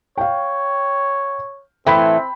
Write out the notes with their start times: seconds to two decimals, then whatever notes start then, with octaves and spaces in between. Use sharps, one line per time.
0.18 C#5 F5 G5
1.86 A2 E3 A3 C4 G5 B5 B6